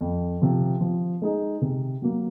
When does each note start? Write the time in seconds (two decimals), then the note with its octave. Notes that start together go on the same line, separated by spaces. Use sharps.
0.01 F2
0.42 C3 F3
0.81 F3
1.22 G#3 D#4 G#4
1.62 C3
2.02 F#3 A#3